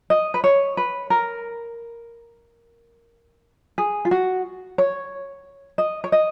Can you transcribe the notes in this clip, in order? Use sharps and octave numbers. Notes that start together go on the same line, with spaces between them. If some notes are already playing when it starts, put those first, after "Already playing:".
D#5
B4
C#5
B4
A#4
G#4
F4
F#4
C#5
D#5
C#5
D#5